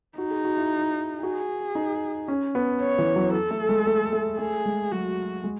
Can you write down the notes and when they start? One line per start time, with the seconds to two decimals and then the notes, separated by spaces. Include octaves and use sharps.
0.18 D#4 F#4
0.31 G#4
0.45 F#4
0.57 E4
1.23 F#4 G#4
1.75 D#4
2.28 C#4
2.55 B3
2.81 C#5
2.99 E3
3.16 F#3
3.34 A4
3.51 A3
3.69 G#3
3.87 A3
4.13 A3
4.39 A3 G#4
4.66 G#3
4.92 F#3 F#4
5.44 G#3